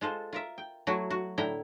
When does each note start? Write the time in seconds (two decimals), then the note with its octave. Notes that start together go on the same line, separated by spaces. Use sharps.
0.01 G#3 F4 A4 C5
0.33 F4 A#4 E5
0.58 G5
0.87 F#3 A3 E4 F#4
1.11 F#4
1.38 A2 D3 E4 G5 A#5